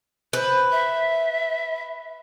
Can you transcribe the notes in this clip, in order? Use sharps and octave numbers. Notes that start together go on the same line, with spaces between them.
B4 C5
E5